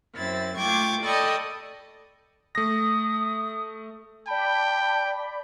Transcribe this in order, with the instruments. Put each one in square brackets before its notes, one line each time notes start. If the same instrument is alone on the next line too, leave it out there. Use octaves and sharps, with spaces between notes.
[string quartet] F#2 C4 E4 A6
A3 F4 G5 C#6 D6 G#6
A4 D5 D#5 G5 B5 C#6
[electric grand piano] A3 A#6 [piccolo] D#6
[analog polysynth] D5 B5 [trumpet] G5 [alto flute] A5